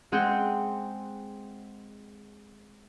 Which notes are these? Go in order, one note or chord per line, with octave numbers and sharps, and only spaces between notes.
G#3 C4 G#4 F#5 G5